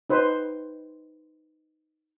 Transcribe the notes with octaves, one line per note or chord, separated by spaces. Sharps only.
D#4 B4 C5